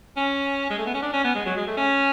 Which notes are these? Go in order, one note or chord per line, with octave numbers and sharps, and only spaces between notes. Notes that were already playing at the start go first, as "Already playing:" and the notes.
C#4
G#3
A3
B3
C#4
D4
C#4
B3
G#3
F#3
G#3
A3
C#4